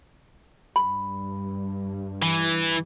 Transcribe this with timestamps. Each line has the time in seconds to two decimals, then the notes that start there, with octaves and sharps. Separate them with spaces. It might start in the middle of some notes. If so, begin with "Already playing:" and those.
0.76 G2 B5
2.22 E3